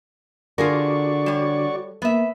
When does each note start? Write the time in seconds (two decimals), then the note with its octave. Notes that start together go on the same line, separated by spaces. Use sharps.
0.58 D3 F4 F#4 G#4 A#4 D5 C#6
1.26 G3 C#5
2.02 A#3 B3 E5